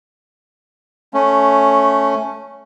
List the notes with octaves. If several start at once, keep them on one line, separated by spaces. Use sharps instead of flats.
A3 C#4